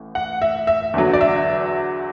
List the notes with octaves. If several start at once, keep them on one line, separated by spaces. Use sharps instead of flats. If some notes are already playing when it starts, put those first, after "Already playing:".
Already playing: A1 A2
F#5
E5
E5
E2 D3 F#3
D5
E5